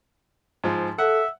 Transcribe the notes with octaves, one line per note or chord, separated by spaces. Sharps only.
G#2 F3
A4 E5 F#5